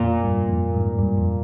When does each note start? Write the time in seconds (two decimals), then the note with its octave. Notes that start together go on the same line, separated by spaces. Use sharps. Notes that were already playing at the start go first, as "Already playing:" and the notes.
Already playing: F2 A#2
0.23 G2
0.49 F2
0.74 G#2
0.99 G2
1.17 F2